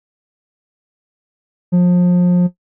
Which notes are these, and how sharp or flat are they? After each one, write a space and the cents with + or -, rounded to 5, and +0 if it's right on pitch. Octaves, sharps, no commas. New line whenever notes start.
F3 +30